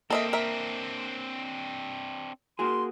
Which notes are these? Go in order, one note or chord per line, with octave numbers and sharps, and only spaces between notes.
A#3 C4 D4 A4 D#5 E5
A#4 E5
A#3 F#4 G#4 C6